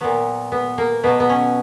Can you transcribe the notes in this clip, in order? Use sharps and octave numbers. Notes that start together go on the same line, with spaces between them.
A#2 F#3 B3
B3
A#3
B2 F#3 B3
B3
C#4